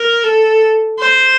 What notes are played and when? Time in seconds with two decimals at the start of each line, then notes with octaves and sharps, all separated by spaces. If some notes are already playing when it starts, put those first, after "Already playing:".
Already playing: A#4
0.23 A4
0.99 C5